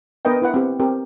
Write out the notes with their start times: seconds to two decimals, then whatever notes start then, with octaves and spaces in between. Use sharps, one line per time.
0.25 B3 D4 A#4 B4 D#5 G5
0.42 E4 B4 F#5
0.54 C4 G4 G5
0.80 C4 G4 A#4